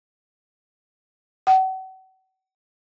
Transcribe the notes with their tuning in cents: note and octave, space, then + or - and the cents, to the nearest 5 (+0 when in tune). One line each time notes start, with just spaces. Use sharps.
F#5 +40